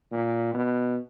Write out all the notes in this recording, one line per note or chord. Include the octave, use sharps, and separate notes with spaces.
A#2
B2